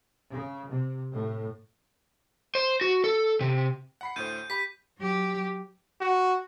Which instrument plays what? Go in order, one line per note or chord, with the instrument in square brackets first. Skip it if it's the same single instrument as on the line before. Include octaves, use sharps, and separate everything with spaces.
[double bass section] C#3
C3
A2
[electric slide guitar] C5
F#4
A4
C3
[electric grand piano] F#5 B5 C7
[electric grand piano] D2 A2 C5 [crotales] G6 D#7
[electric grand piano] G4 B5 [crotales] B6
[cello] F#3 G4
[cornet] F#4